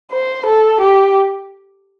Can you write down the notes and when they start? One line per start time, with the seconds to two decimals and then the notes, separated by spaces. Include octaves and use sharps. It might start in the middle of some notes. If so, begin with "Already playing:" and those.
0.11 C5
0.46 A4
0.81 G4